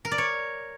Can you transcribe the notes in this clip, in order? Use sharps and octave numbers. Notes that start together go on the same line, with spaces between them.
A#4
D5
C#5